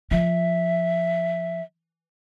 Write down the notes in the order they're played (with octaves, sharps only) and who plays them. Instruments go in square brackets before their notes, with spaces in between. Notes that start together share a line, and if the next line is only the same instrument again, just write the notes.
[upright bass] F3 [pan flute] E5